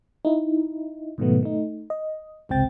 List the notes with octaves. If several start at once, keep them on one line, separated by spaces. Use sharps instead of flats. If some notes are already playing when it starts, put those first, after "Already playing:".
D#4 E4
G#2 B2 D#3 F#3 A3 B3
A3 D#4
D#5
G1 C#2 C3 C4 G5 A6